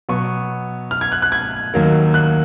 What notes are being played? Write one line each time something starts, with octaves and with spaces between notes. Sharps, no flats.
B2 F#3 B3 C#6
F6
G#6
F#6
F#6
G#6
D#2 D#3 F#3 A#3
F#6